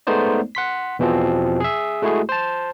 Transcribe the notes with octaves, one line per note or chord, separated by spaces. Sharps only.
G#3 A3 B3 D#4 C5 D5
F#5 C6 B6
E2 B2 E3 F3 C4
G#4 E5
G#3 A3 E4 F#4 G#4
C5 A5